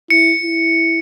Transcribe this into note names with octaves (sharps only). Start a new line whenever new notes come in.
E4 C#7
E4